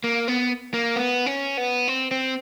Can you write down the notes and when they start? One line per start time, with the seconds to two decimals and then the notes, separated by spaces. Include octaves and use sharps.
0.04 A#3
0.28 B3
0.74 A#3
0.96 B3
1.26 C#4
1.57 B3
1.88 C4
2.11 C4